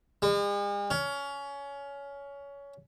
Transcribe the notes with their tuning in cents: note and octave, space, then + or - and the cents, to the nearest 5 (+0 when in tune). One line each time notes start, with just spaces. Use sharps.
G#3 -45
C#4 +20